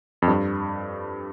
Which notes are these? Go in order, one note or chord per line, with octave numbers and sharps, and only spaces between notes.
F2
G2